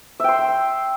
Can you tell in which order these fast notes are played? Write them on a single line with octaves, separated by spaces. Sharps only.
E5 G5 C6